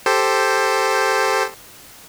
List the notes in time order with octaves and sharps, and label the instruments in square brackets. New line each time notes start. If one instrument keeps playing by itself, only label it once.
[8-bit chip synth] G4 A4 C5